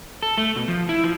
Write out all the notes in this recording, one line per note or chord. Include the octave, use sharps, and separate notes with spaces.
A4
A3
B2
F3
E4
F3